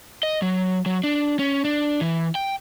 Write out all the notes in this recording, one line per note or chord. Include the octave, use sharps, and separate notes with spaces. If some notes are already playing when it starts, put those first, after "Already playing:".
D#5
F#3
F#3
D4
C#4
D4
E3
G5